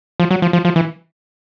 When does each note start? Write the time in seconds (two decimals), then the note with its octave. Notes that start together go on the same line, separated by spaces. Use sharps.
0.20 F3
0.31 F#3
0.42 F3
0.53 F3
0.65 F3
0.76 E3